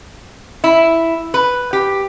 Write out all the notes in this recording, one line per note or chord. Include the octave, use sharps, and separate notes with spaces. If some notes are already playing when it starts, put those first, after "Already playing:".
E4
B4
G4